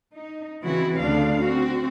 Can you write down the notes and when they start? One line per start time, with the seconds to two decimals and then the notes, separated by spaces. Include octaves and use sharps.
0.15 D#4
0.64 C#3 E3 C4 E4 F#4
1.00 D2 C#3 D4 F5
1.44 C4 F#4